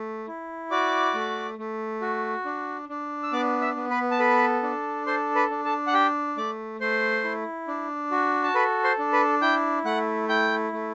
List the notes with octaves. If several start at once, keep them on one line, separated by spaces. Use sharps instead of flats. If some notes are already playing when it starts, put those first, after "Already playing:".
Already playing: A3
E4
F#4 D5 D6
A3
A3
F#4
D4
D4
E6
B3 D5 D6
E5 E6
B3
B4 B5
A5
A4 B4 B5
D4
A4 C5 C6
B4 B5
D4
A4 A5
F#5
G4 G5
A3 D5 D6
A3 C5 C6
E4
D4
F#4
A5
A4 B4 B5
C5 C6
D4
B4 B5
E4 G5 G6
A3 F#5 F#6
E4 G5 G6
A3